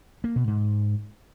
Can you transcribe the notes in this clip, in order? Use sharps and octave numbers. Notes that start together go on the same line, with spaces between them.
A#3
B2
G#2